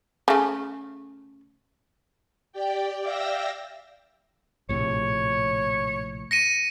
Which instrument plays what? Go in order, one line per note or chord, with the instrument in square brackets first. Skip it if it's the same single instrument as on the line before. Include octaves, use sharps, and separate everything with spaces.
[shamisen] C#3 A3
[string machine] G4 D5 G5
D5 E5 F5 G5 E6 A#6
[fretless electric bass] A#1 A2 C3 [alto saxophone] C#5
[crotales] A#6 C#7 D#7